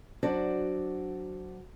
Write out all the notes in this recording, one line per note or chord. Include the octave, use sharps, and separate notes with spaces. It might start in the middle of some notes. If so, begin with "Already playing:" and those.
F#3 D4 F#4 C5 D5